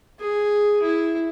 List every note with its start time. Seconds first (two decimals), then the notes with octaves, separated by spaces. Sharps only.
0.19 G#4
0.83 E4